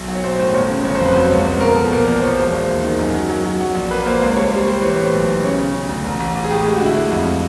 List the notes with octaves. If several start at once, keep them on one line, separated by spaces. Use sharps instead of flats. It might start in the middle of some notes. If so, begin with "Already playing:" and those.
Already playing: B1
F#3
C#5
B1 C5
A2 C5
G1 C#5
C#3
G1 C#5
C5
F2
B4
F#3 C5
C#2 C#5
C#2 C5
B2 A#4
F3 A4
A#2 A#4
A#1 C5
F3 C#5
E1 C5
D#2 C5
D#2
D#3
F#2
F#3
F#3
F#3
F#3
A#1
A#3 B4
A#3 C5
C#2 C5
G3 C#5
G3 C5
C#5
G3 C5
E3 C#5
C5
A2 C#5
B1
B1
C#3 C#5
C#3
C#3
D2
A1
A1
A1
G#4
A2 G4
G#3 G4
F#4
D3 E4
G#3
F2